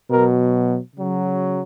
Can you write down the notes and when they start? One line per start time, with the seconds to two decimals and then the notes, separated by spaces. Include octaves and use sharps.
0.10 B2 F#3 A#4
0.95 C#3 F#3